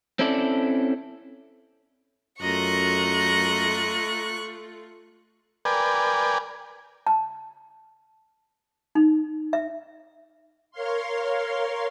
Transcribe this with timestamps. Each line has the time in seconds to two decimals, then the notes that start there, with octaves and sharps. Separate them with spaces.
0.19 C4 C#4 E4 A4 D5
2.41 F#2 A3 F4 D#5 A#5 C#6 F#6
5.65 A#4 B4 D5 G5 G#5
7.07 A5
8.95 D#4
9.53 E5
10.71 A#4 C#5 F5 C6